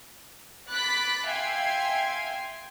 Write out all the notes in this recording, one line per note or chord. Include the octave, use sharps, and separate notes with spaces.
B5 D6 F#6 A6 B6
E5 F5 G5 G#5 C6 G#6